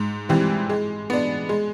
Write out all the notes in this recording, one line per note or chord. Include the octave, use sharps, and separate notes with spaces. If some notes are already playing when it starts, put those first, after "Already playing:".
Already playing: G#2
E3 G3 C4
G#3
B3 D4
G#3